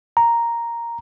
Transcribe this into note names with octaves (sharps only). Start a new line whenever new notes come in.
A#5